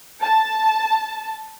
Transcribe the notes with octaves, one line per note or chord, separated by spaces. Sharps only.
A5